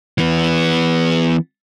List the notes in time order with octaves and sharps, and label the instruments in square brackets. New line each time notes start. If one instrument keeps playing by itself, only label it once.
[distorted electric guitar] E3 B3